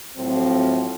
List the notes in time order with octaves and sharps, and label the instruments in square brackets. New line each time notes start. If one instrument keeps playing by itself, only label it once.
[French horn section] A2 F3 F#3 C4